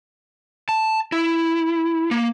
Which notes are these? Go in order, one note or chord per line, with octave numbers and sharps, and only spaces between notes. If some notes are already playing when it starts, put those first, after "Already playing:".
A5
E4
A#3